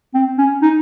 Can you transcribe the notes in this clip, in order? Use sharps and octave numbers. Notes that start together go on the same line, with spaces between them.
C4
C#4
D#4